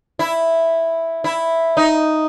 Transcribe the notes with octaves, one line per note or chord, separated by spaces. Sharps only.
E4
E4
D#4